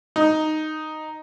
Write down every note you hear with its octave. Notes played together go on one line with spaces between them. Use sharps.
D#4